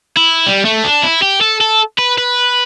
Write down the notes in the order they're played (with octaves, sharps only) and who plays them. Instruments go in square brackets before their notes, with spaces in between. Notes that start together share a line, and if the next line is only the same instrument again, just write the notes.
[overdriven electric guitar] E4
G3
A3
D4
E4
G4
A4
A4
B4
B4